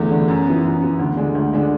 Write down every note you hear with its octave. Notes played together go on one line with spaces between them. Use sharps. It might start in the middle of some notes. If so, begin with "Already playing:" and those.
Already playing: E2 D3 A3
D3 A3
F#2
E3 B3
F#2
E3 B3
D2
D3 G#3 D4
D2
D3 G#3 D4